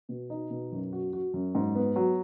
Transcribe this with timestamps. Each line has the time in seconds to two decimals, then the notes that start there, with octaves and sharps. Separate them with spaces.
0.09 B2
0.30 D#4
0.50 B2
0.72 F#2
0.93 F#4
1.13 F#4
1.34 F#2
1.55 G#2
1.75 B3
1.96 F#3